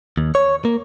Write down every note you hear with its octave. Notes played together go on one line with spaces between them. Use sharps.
D#2
C#5
A#3